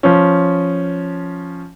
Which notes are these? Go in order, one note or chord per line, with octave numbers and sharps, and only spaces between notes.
F3 C#4